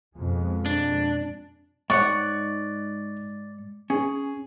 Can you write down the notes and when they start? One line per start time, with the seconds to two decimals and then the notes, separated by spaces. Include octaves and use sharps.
0.18 F2 B2 G#3
0.66 D4
1.90 G#2 C#5 D5 F#5 C#6 F#6
3.90 C#4 G#4